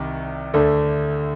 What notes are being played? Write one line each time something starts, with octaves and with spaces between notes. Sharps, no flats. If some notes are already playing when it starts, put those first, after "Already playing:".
Already playing: C2 C3 D#3
D2 D3 A3 D4 A4